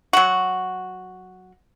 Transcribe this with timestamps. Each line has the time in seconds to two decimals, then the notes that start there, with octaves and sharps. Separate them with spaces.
0.13 F#3 F#4